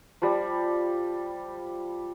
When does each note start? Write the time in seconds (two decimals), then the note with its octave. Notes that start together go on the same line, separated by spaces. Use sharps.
0.22 F3 G3